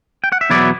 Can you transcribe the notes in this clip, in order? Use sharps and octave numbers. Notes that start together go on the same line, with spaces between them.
G5
F#5
E5
E2 B2 F#3 B3 E4 D5